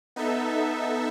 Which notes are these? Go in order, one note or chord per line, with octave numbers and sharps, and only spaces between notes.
B3 D#4 A4 E5